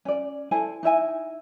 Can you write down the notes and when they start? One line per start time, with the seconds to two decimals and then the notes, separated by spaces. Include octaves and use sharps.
0.05 C#4 D5
0.51 E4 A4 C5 G#5
0.83 D#4 E4 E5 G#5